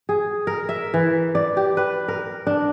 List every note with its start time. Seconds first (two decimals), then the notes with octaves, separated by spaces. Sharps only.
0.09 G#4
0.47 A#4
0.69 E5
0.94 E3
1.35 D5
1.57 G4
1.77 B4
2.08 A#4
2.47 D4